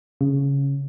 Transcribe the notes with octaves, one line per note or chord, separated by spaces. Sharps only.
C#3